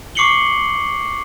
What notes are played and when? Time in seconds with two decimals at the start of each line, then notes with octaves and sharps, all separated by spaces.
0.15 C#6 D6 C7 C#7 F#7 G7